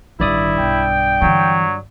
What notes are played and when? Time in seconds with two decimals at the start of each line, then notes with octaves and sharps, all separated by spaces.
0.20 A1 G2 D#3 E4 D5 D#6
0.59 B1 G5
1.22 D3 E3 F#3